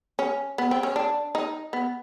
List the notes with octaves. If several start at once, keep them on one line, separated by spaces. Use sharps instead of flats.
C#4
B3
C4
C#4
D4
D#4
B3